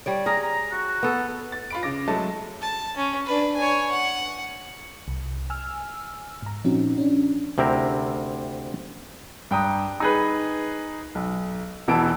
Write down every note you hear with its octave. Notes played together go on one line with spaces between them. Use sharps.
G3 C#5 D5
G#4 A#5
A#5
F#4
B3 A4
A6
F4 B5 D7
C#3 D6 A#6
F#3 G#3 A3 A5
A5
C#4
D4 B4
C#5 G#5
F#5
C2
G#5 E6 F6
G#2 A#5
A#2 F3 C4 C#4 D#4 F#4
C#4 D4
D2 C3 C4 E4 A#4
G2 G5 A#5 D#6
D#4 G#4 B4
B1
E1 B2 E3 A5 D7